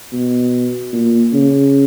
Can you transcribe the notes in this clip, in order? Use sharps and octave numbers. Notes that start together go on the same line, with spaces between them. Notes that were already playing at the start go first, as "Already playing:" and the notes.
B2
A#2
C#3